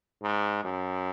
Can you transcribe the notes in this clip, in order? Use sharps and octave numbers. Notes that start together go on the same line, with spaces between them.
G#2
F#2